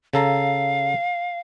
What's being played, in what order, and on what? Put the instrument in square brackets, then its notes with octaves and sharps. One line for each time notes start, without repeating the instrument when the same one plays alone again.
[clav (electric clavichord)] C#3 A4 A#5 [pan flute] F5